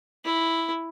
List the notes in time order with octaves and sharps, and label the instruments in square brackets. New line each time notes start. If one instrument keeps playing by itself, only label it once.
[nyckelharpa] E4